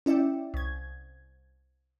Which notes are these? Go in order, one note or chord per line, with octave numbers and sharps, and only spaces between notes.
C#4 E4 D5 E5 G5
C2 G#6